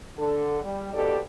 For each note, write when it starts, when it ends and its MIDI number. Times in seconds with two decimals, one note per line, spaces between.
0.18 0.61 50
0.18 0.61 69
0.62 0.92 55
0.93 1.17 41
0.93 1.17 44
0.93 1.17 47
0.93 1.17 67
0.93 1.17 69
0.93 1.17 74